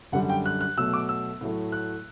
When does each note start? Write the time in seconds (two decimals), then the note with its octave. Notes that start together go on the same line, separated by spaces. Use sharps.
0.12 F#2 D3 G3 F#5
0.30 G5
0.46 F#6
0.61 F#6
0.77 B2 F#3 A3 E6
0.94 D6
1.09 E6
1.41 A2 F#3 A3
1.72 F#6